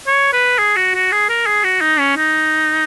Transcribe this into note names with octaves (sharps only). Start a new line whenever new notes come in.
C#5
B4
G#4
F#4
F#4
G#4
A#4
G#4
F#4
D#4
C#4
D#4